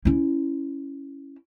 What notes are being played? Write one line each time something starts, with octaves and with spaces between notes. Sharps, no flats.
C#4 E4